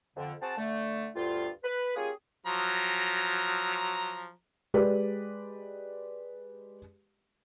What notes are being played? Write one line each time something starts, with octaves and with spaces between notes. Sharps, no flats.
F2 D3
C4 F#4 G#4 C5 F#5 A5
D3 A3
D2 G2 F4
B4
A#3 C#4 F4 G4 G#4
F3 F#3 A#5
G#3 G4 B4 D5